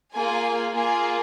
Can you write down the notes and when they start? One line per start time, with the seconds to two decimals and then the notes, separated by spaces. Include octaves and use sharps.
0.14 A#3 F4 G#4 G#5
0.75 A#3 F4 G#4 G#5